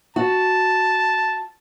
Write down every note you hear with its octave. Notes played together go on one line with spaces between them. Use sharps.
F#4 A5